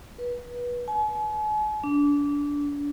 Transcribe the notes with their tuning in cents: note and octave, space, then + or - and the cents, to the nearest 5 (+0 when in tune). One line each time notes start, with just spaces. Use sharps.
B4 -25
G#5 +45
D4 -25